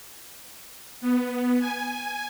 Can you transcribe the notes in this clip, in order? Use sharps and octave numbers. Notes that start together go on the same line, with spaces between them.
B3
G#5